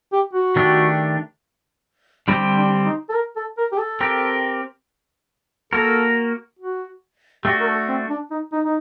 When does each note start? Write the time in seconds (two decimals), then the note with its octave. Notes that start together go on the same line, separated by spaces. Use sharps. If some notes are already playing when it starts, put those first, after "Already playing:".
0.12 G4
0.33 F#4
0.56 D#3 A3 D4 G4
2.28 D3 G3 C4 D4 G4 C5
2.57 D4
2.85 D#4
3.09 A4
3.14 A#4
3.36 A4
3.58 A#4
3.72 G4
3.78 A4
4.00 C4 G4 A#4
5.73 A#3 F#4 A4 A#4
6.59 F#4
7.44 A3 D4 F#4 G4
7.60 A#4
7.67 A4
7.88 C4
8.10 D4
8.31 D#4
8.53 D#4
8.64 D#4